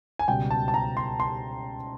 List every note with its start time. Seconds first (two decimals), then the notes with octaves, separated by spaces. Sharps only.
0.19 G#5
0.28 C#2 B2 G3 G5
0.50 A5
0.68 A5
0.74 A#5
0.97 C6
1.20 C6